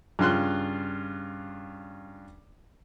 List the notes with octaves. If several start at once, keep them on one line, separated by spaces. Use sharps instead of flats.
G2 C#3 F4 C6 F#6